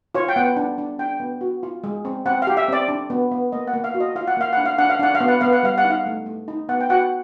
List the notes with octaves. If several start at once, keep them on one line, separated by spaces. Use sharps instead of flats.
F4 C#5
G5
B3 F#5
D4
D4
D4 G5
B3
F#4
F4
G#3
C4
C4 F#5
F5
G4
E5
C4 D5
D4
B3
B3
A#3 D#5
F#5
A#3
F5
F#4
D#5
F4 F5
F#5
A#3 F5
D4 F#5
F5
D4 F#5
F5
D4 F#5
F5
B3
F#5
B3 F5
F#5
G3 F5
F#5
D#4
F5
A3
A3
D#4
B3 F#5
G5
F#4 F#5